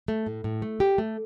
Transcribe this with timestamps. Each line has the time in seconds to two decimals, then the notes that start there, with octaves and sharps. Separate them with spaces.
0.08 A3
0.26 A2
0.44 A2
0.62 A3
0.80 G4
0.98 A3